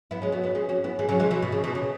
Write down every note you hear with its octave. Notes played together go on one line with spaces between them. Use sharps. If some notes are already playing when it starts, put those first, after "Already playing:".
B3 E4
G#3 C#4
F#3 B3
F#3 B3
G#3 C#4
C#4 F#4
B3 E4
E3 G#3
C#3 F#3
E3 G#3
B2 E3
B2
C#3
B2 E3
C#3